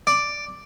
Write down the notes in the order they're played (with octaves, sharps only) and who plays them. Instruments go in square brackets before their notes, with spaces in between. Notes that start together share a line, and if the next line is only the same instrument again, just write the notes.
[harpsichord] D5